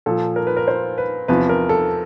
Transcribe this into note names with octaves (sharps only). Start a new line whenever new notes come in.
A#2 F3 A4
A#4
B4
A#4
C5
B4
E2 C3 F3 B4
A#4
A4